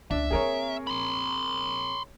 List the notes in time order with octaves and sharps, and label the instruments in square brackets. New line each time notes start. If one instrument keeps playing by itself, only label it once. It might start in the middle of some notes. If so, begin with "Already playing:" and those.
[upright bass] C#2 [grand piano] D4 [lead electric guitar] E5
[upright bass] A#3 C4 [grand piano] G#4 A#4 C#5
[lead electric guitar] B5 C6